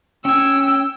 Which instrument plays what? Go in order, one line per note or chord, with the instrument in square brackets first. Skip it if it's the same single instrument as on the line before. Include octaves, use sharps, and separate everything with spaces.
[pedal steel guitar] C#4 G#5 [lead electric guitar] G5 [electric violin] E6